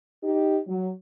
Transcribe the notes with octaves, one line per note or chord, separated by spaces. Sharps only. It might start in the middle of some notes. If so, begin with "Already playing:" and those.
D#4 G4
F#3